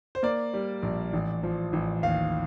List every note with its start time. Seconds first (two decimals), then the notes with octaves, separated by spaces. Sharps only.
0.15 C5
0.23 A#3 D5
0.54 G3
0.83 A#1
1.13 A1
1.43 F3
1.73 A1
2.03 D#2 F5